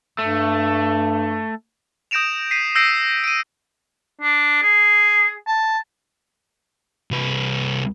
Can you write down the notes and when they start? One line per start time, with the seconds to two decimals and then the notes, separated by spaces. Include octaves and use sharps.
0.19 G2 A3
2.11 D#6 G6 A#6 D7 E7 F7
2.51 B6 C7 D7 D#7
2.75 E6 G6 A#6 C7 D7
3.24 D7 D#7
4.21 D4
4.62 G#4
5.47 A5
7.11 C2 B4